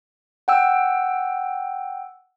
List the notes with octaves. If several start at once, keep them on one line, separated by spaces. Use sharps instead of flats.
F#5 G5 E6